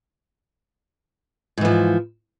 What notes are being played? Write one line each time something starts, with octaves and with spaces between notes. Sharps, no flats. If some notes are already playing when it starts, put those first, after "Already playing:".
G#2 E3 F3